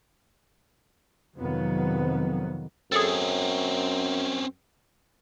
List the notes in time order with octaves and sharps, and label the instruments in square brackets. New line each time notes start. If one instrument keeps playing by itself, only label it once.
[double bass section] F2 C3 D#3 F#3 B3
[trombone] F#2 [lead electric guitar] C4 C#4 [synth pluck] G#4 A4